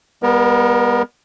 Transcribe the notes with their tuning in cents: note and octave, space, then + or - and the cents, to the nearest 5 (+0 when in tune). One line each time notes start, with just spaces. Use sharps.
G3 +35 B3 -15 A#4 +20